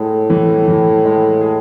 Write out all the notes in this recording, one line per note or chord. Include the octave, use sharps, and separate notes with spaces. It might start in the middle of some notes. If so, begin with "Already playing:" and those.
Already playing: A2 G#3 G#4
E3
E3
G#3
G#4